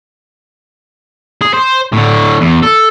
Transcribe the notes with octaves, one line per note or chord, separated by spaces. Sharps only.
G#4
C5
A2 D3
E2
A4